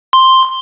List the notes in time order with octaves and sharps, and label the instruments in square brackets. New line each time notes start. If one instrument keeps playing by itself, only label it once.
[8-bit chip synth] C6